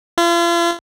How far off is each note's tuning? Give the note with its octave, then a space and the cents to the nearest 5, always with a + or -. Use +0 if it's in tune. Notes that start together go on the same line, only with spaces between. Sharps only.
F4 -40